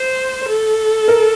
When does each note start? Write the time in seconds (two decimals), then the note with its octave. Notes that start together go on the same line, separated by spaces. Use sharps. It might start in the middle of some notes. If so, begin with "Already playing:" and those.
Already playing: C5
0.49 A4
1.08 A#4